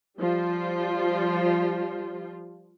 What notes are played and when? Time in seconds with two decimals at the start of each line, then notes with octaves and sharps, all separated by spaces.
0.19 F3 G3 F4